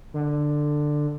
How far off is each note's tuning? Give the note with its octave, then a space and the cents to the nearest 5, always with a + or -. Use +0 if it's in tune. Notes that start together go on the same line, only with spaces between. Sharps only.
D3 +10